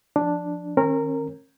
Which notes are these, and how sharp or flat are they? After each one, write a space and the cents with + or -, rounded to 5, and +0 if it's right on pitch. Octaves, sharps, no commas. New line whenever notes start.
F3 +5 D4 +0
D#3 +0 C#4 -40 A#4 -15